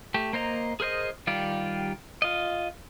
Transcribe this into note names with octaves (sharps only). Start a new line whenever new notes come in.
A3 G4
A#3 C5 D#5 A#5
G#4 A#4 C5 D#5
D#3 G3 F4 G4 D5
F4 D#5